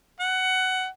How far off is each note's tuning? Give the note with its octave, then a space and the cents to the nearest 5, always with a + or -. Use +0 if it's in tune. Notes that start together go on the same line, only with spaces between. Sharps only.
F#5 +15